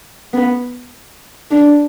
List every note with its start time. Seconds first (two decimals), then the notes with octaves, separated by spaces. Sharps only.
0.33 B3
1.51 D4